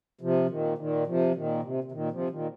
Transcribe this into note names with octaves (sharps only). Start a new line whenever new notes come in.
C3 F3
A#2 D#3
A#2 D#3
C3 F3
A#2 D#3
C3
C3
A#2 D#3
C3 F3
A#2 D#3